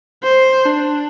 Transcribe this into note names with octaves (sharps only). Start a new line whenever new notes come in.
C5
D4